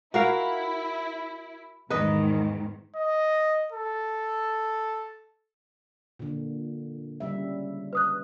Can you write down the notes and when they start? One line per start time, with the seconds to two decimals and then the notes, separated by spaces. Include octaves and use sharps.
0.14 E4 F#4 A#4 F5
1.90 E2 G#2 D#3 B4 D#5
2.96 D#5
3.72 A4
6.19 A#2 D3
7.20 C#3 G3 E5
7.93 B4 D#6 F#6